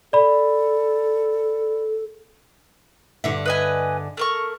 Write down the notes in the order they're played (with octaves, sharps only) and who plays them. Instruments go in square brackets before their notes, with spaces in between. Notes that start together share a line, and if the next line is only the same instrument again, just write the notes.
[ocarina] A4 [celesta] D5 B5
[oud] G2 D3 E5
[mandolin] B4 D#5 G#5
A3 A#4 C#6